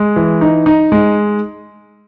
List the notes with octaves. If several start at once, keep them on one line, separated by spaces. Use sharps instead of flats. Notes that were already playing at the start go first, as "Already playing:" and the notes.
Already playing: G#3
E3
D#4
D#4
G#3